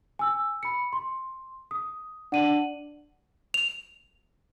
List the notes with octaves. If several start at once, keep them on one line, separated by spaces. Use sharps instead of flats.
G#5 E6
B5 C#7
C6
D#6
D4 F#5 D#7 F#7
F7